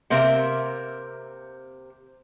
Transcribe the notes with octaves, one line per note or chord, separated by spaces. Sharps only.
C3 A#3 C4 A#4 E5